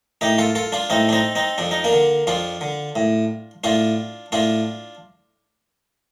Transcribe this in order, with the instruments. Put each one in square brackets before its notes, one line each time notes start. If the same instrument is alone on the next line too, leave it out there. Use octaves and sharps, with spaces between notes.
[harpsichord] A2 D#4 G4
F4 A4
F4 A4
D4 F4
A2 C4 D#4
D4
C4 D#4
C4 D#4
F2 D4
D#4
A#3 D4
D3
F2 D4 F4
D3
A2
A2 D4 F4
A2 D4 F4